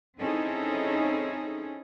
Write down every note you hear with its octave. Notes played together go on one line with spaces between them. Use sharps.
C4 C#4 D#4 E4 G#4 A4